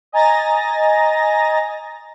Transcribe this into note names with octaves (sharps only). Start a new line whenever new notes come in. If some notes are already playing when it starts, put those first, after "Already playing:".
D#5 G#5 A#5 A6 A#6